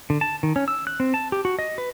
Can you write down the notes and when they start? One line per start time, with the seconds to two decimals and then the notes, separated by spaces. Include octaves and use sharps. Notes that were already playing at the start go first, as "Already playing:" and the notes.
0.10 D3
0.21 A5
0.43 D#3
0.56 C#4
0.68 E6
0.87 F#6
1.00 C4
1.14 A5
1.32 G4
1.45 F#4
1.59 D#5
1.78 B4